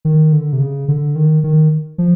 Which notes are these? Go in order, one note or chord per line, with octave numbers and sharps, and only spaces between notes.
D#3
D3
C3
C#3
D3
D#3
D#3
F3